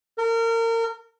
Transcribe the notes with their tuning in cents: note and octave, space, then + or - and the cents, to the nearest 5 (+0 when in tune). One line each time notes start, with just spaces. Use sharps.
A#4 -30